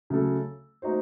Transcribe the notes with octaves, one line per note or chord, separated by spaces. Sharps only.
C#3 F#3 A3 C#4 A4
A3 D#4 F#4 C5